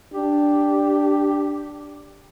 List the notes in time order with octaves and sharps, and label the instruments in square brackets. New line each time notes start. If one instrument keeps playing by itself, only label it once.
[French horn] D4 [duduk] G4